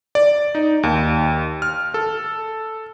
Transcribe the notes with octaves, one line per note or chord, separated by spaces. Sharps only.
D5
D#4
D#2
F6
A4